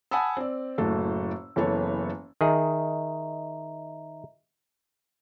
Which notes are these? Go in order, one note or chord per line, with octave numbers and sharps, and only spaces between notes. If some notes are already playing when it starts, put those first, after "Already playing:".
F#5 G#5 A5 B5 D#6 E6
C4 D5
F#1 A2 F#4 A4
F#1 E3 B3 A4 C#5
D#3 G#4 D#5 E5 A#5